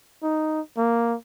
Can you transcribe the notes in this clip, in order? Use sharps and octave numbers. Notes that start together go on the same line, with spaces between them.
D#4
A#3